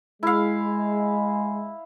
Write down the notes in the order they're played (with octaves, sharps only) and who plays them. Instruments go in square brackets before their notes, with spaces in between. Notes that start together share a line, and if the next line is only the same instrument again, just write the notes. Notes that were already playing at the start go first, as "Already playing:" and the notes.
[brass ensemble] G#3 [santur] E4 F5